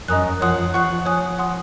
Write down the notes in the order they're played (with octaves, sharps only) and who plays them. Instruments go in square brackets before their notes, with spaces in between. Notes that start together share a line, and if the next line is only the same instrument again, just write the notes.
[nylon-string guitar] F#2 [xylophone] D#5 A#5 D#6 F#6
[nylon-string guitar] F3 [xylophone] C#5 F#5 C6 D#6 F#6
[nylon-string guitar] F3 [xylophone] F#5 C#6 F#6
[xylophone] C#5 G#5 D#6 F#6
F#5 C6 D#6